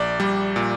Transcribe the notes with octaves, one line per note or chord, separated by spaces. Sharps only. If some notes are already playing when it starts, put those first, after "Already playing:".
Already playing: A#1 D5
G3
A#2